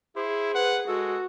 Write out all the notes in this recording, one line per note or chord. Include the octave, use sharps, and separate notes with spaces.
E4 G#4 C5
B4 F#5
G#3 F#4 A4